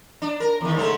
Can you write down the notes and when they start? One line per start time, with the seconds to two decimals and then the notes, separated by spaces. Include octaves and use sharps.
0.22 D4
0.40 A#4
0.61 E2 D#3
0.75 G#2 C#3 A3